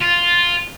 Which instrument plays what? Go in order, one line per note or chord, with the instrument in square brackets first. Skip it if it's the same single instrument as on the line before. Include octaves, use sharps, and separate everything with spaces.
[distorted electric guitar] F4